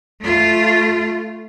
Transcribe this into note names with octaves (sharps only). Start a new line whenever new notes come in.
A3 F4